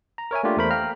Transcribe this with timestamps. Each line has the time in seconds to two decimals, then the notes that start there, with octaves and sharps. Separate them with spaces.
0.18 A#5
0.31 A#4 C#5 E5 G#5
0.44 A3 A#3 D4 F4 G4
0.57 E2 A3 A#4 C5 B5
0.71 F5 G5 A#5 F6